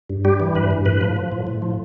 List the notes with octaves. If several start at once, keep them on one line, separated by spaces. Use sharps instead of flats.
G2
G3 G4
E3
G2 B4
G2
A2 B4
F3
F3
A2
A2
F3